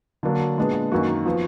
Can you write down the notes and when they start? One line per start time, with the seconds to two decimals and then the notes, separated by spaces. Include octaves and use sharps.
0.23 D3 F#3 A#3 D4
0.57 A#2 G#3 B3 D4
0.92 F#2 D#3 A#3 F#4
1.26 F3 B3